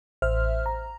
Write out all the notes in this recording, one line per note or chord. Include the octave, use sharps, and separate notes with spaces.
A1 C5 E5 F6
A#5